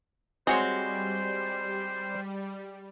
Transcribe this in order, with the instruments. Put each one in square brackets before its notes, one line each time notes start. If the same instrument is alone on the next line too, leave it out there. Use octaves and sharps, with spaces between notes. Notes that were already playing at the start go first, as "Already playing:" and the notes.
[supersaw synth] G3 [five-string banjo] G#3 [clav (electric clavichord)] C4 F#4 C#5 [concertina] C5